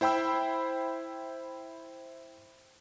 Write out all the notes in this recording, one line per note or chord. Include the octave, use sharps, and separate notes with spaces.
E4 C5 G5 B5 E6